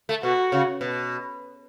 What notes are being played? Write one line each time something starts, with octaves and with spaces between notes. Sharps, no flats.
A3
B2 F#4
C#3
B2